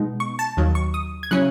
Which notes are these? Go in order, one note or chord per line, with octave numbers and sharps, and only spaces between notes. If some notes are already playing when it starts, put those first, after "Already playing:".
Already playing: B2 G#3 B3 D#4
C#6
A5
D#2 D#3 F#3
C#6
D#6
G#6
C#3 F#3 C#4 E4 F#6